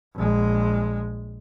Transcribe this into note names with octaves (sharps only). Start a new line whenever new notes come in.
A#1 G#3